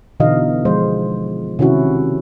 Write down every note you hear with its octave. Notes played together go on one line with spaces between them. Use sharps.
B2 D3 E3 D#4 D#5 F5
F3 G#3 C5
C3 D#3 C#4 E4 F#4